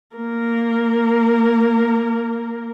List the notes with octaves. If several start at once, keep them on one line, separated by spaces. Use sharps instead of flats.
A#3 A#4